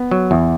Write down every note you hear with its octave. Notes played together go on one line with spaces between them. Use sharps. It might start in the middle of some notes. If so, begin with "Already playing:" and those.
Already playing: B3
F#3
E2